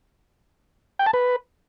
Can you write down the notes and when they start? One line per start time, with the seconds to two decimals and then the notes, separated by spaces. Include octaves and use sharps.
0.99 G5
1.06 A5
1.13 B4